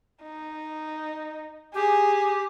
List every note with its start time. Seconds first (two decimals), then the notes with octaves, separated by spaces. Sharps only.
0.23 D#4
1.74 G4 G#4